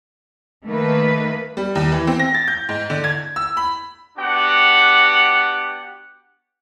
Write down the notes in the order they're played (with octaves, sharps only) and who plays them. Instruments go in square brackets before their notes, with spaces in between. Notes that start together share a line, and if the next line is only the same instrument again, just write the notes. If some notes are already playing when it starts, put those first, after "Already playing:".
[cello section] D#3 A3 A#3 B4
[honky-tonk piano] G3
D#2
E3
C4
A#6
A6
G6
G#2
D3
G#6
E6
B5
[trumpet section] B3 D4 F#4 G4 F#5